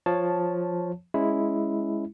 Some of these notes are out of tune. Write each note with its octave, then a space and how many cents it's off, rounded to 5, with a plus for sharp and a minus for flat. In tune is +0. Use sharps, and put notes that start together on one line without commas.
F3 +5 C#5 +0 A5 +0
G#3 +0 C#4 +0 E4 +0